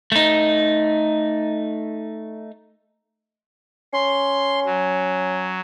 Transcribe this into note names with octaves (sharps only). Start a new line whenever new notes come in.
A3 D#4
C#4 C6
F#3